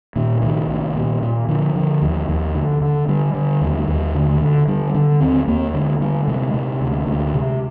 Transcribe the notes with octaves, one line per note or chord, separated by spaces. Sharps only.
A#2 D#3
C2 D#3
C2
A#2
A#2
D3 F3
D3
D#2
D#2
D3
D3
D3 G3
D3
D#2
D#2
D3
D3
D3 G3
D3 D4
D#2 C4
D#2 A#3
D3 G#3
D3 G3
C3 G#3
C3
D2
D2
C3